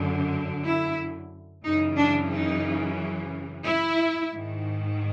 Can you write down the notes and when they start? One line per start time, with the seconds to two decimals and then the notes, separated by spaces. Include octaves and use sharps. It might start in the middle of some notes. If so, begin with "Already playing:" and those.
Already playing: F#2 D3
0.64 E4
1.64 F#2 C#3 E3 D#4
1.97 D4
2.31 D#4
3.64 E4
4.31 G#2 D#3